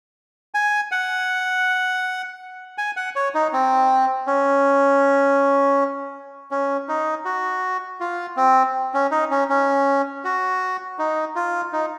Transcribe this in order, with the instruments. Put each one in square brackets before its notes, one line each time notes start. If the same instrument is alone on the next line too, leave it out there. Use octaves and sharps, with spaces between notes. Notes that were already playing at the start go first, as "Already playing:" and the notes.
[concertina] G#5
F#5
G#5
F#5
C#5
D#4
C4
C#4
C#4
D#4
F#4
F4
C4
C#4
D#4
C#4
C#4
F#4
D#4
F4
D#4